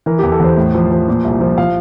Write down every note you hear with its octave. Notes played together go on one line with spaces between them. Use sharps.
E3 A#4
E2 G4
A4
E2 C5
A2
F3
F3
A#2
C2
F3
F3 F5